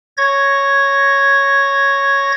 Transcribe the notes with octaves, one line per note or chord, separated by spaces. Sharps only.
C#5 G#6 A#6